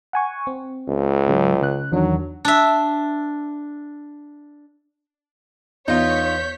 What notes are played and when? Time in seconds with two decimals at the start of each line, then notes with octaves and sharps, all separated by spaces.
0.13 F#5 G#5 C#6
0.47 C4
0.88 C#2
1.27 G#2 C#3 F#3
1.62 C#3 F#6
1.92 E2 D#3 F#3 D4
2.45 D4 E5
5.88 E2 D#4 F4 C#5 G6 B6